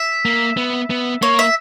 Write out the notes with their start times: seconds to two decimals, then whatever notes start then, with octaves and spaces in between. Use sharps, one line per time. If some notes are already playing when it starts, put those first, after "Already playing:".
Already playing: E5
0.25 A#3
0.57 B3
0.90 B3
1.22 A#3 C#5
1.39 E5